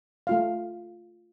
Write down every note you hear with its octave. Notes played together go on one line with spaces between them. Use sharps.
A3 F4 F5